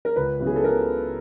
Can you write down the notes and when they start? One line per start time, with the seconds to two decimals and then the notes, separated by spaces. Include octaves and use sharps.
0.05 A#4
0.16 C#2 B4
0.40 C#3 F#3 B3 E4
0.47 G#4
0.56 A4
0.64 A#4